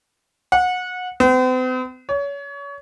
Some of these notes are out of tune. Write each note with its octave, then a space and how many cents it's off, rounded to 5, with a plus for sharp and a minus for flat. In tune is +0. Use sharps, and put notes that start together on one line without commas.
F#5 -25
C4 -45
C#5 +30